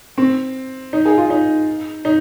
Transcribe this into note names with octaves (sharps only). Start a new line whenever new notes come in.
C4
D#4
G#4
F4
D#4
D#4